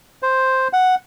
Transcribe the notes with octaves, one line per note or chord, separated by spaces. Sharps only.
C5
F#5